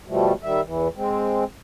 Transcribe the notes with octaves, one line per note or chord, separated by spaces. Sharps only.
B2 F3 G3 A3
D#3 G3 E5
E2 E3
G#3 C4